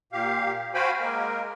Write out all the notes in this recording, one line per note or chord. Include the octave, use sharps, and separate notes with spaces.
A#2 G4 F5
F#4 C5 F5 G5 G#5 B5
G#3 A#3 A#4